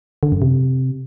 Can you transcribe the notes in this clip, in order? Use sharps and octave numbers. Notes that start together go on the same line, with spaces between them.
D3
F#2
C3